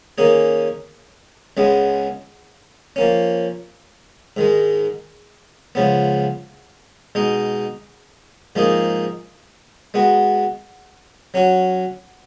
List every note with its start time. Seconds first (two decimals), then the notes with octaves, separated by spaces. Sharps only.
0.18 D#3 A#3 C#4 G#4
1.57 C#2 C#3 G#3 B3
2.96 F3 A#3 C#4
4.37 G#2 D#3 G#3
5.75 C#2 C#3 F3 B3
7.15 B2 G#3 D#4
8.55 G#2 F3 A#3 D#4 G#4
9.94 G#3 B3 F#4
11.34 F#3 C#4 F#4